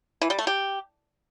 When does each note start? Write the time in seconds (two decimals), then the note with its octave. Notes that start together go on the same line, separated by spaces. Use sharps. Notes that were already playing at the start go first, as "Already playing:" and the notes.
0.22 E3
0.30 G3
0.39 A3
0.47 G4